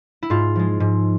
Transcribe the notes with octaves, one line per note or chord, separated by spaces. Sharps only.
E4
G#2 F4
F3 G#3
G#2